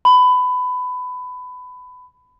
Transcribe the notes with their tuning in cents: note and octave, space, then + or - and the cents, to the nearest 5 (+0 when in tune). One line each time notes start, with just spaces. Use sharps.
B5 +20